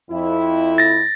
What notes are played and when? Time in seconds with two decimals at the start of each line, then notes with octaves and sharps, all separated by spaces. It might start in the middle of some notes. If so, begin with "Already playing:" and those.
0.11 F2 E4
0.78 A6 A#6